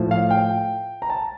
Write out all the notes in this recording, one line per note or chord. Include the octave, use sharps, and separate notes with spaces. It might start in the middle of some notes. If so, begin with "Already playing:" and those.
Already playing: A2 F3
F5
G5
A#5
A5